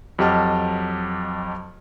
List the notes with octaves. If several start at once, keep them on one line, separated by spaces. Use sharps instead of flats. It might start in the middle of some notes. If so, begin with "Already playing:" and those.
F2 F#3 G4 D#5 A5 F6